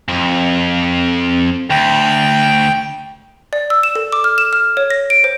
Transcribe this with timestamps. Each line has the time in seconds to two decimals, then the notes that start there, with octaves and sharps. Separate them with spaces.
0.08 F2
1.70 D2 G5
3.53 D5
3.70 E6
3.83 E7
3.95 A4
4.12 D6
4.24 F6
4.38 E7
4.53 F6
4.77 C#5
4.90 A#6
5.10 D7
5.24 C5